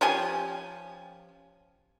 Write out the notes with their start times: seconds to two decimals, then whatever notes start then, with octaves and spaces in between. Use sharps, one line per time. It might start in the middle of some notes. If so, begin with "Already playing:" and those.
0.01 F3 C#4 G4 G#5